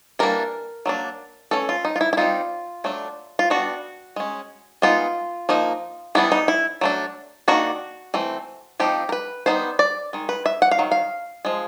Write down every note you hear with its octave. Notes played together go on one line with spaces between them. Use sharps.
E3 G3 A#3 D4 A#4
F#3 A#3 D4
E3 A3 C#4 A4
F4
D#4
F4
E4
E4
G3 C4 D#4 F4
F#3 A3 D4
F4
G3 B3 D4 F#4
G#3 C#4
G#3 B3 D#4 F4
F3 A#3 D#4
E3 G3 B3 D4 E4
D#4
E4
F#3 A3 D4
D#3 F#3 A#3 D4 F#4
E3 A3 C4
F3 A3 C4 D#4 G4
A#4
B4
G3 B3 D#4 C5
D5
D#3 G#3
B4
E5
F#5
F5
D#3 F#3
F5
F3 G#3